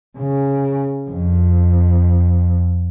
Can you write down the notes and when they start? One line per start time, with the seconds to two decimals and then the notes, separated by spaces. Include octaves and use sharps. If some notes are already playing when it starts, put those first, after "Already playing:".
0.18 C#3
1.10 F2